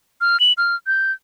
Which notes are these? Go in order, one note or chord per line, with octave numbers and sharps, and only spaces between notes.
F6
F#7
F6
G6